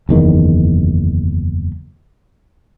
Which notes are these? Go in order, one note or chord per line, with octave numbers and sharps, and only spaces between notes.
F#1 E2 D#3